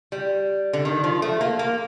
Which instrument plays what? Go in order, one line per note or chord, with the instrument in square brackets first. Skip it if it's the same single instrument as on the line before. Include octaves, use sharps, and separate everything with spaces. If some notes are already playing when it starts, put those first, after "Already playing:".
[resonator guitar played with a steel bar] G3
D3
D#3
F3
A3
A#3
A#3